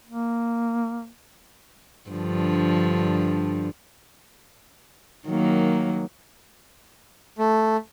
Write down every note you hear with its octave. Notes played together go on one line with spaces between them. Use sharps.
A#3
G2 D3 F3
D#3 F#3 A#3
A3